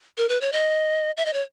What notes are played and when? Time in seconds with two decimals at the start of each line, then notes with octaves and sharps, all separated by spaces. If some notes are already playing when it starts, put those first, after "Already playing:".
0.18 A#4
0.29 B4
0.41 C#5
0.52 D#5
1.17 E5
1.26 D#5
1.33 C#5